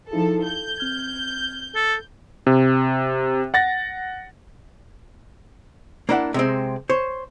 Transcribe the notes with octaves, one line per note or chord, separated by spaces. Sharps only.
F3 D#4 E4 G#4 A4
A4 G6
C4 F6 G#6
A4
C3
F#5 A6 A#6
A#3 D4 E4 D5 F#5
C3 G#3 C4
C5 C#5